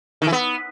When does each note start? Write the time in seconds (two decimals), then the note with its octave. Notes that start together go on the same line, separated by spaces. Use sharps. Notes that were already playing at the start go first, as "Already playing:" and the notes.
0.22 D#3
0.27 E3
0.32 B3